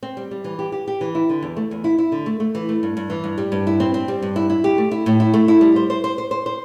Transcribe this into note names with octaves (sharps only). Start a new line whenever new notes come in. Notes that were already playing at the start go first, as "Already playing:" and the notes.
C4
G3
G3
E3
G4
G4
G4
E3
E4
D3
E2
A3
E2
E4
E4
D3
A3
A3
E3
A3
G2
G2
E3
G2
G3
G2
E4
C4
C4
G3
G2
E4
E4
G4
A3
E4
A2
E4
A3
E4
G3
C5
C5
C5
C5
C5
C5